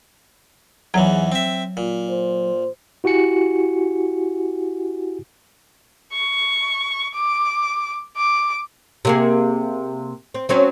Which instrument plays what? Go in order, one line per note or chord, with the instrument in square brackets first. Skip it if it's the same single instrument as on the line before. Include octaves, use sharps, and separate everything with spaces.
[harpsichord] E2 G#2 E3 [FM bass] F#3
[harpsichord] C4 E5
A#2
[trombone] C5
[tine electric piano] E4 F#4 G4 G#5 C#7
[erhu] C#6
D6
D6
[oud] C3 A#3 G#4
C4
F#3 C4 C#4